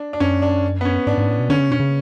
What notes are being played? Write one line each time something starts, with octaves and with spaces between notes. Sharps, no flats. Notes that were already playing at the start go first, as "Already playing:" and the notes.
Already playing: D4
D4
F#2 C#4
D4
B3
C#4
G#2 D4
G#2
A2
B2
D3 C#4
C#3
B2 C#4
C#3